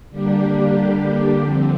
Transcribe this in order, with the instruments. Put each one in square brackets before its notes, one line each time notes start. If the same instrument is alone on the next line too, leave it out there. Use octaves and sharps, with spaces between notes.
[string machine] D3 G3 A#3 D4 G4
D3 F3 C4